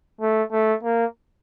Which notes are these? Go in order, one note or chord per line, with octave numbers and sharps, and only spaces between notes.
A3
A3
A#3